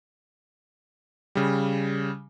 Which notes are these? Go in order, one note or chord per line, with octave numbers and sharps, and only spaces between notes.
C#3 G3